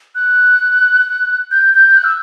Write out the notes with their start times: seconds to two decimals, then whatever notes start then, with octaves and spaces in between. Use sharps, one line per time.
0.15 F#6
1.51 G6
1.74 G6
1.97 F#6
2.04 E6